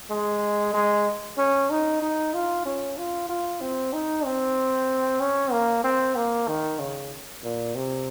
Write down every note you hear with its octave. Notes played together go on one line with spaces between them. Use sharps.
G#3
G#3
C#4
D#4
D#4
F4
C#4
F4
F4
C4
D#4
C4
C#4
A#3
C4
A#3
D#3
C#3
A#2
C3